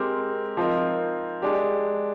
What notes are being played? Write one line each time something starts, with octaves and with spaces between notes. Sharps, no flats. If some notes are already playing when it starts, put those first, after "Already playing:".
Already playing: G#3 C4 G4 A#4
F3 C4 D#4 A#4
G#3 D4 G4